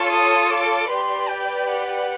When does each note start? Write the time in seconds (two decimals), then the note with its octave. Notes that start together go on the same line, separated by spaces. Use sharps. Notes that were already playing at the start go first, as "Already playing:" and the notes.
Already playing: F4 A4 C#5
0.11 D#6
0.51 D6
0.89 G4 B4 D5 C6
1.29 G5
1.68 F#5